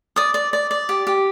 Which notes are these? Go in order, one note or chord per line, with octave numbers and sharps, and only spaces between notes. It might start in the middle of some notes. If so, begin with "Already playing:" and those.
D5 D#6
D5
D5
D5
G4
G4